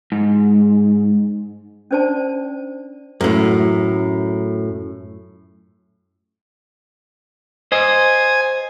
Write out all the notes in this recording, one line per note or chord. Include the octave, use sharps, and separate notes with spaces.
G#2
C#4 D4 C5 D5 A5
F#2 A2
C5 D#5 G#5